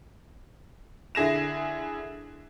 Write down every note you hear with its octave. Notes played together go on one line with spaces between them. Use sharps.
D3 E4 G#4 A#6 E7